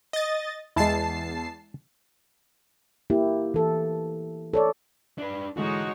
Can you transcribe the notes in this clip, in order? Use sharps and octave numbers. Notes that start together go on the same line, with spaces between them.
D#5 A6
E2 G#3 E4 A5 C7
A#3 E4 G4
E3 A4
A4 C#5 D5
D4 B4
G#2 D3 E3 G#3 D#4 F#4 C#5